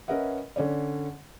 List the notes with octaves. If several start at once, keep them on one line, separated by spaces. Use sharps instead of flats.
C#4 A#4 B4 D#5 E5 F#5
D3 C#4 C#5 D5